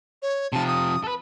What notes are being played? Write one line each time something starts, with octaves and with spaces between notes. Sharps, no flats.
C#5
C3 F3 A5
D#6
A4 B4